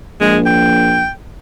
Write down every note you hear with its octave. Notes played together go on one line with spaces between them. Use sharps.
A#1 G#3
G5